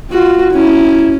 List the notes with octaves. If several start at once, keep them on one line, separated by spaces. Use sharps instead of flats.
F4 F#4
C#4 E4